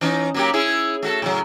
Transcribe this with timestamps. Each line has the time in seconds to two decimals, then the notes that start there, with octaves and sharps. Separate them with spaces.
0.01 E3 C#4 D#4
0.34 F#3 A#3 G4
0.53 C#4 E4 G#4
1.03 A3 F#4 A4
1.22 A2 C#3 F#3